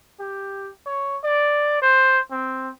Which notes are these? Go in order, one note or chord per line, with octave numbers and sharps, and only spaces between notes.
G4
C#5
D5
C5
C4